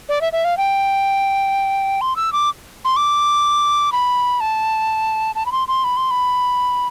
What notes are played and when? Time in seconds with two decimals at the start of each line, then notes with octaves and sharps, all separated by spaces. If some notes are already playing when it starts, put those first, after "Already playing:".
0.09 D5
0.21 E5
0.32 E5
0.44 F5
0.57 G5
2.01 C6
2.16 E6
2.32 D6
2.85 C6
2.96 D6
3.92 B5
4.40 A5
5.35 A5
5.46 B5
5.52 C6
5.68 C6
5.84 B5
5.97 C6
6.11 B5